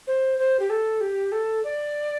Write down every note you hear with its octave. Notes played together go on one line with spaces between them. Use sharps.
C5
C5
G4
A4
G4
A4
D5